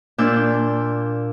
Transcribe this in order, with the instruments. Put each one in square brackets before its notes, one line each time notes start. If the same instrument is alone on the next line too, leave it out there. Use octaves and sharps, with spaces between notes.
[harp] A#2 D4 E6 G6